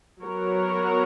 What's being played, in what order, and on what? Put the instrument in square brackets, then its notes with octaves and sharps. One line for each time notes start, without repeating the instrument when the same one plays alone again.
[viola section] F#3 B3 F#4 A#4 C#5